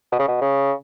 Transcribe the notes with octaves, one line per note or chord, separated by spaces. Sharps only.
B2
C#3
B2
C#3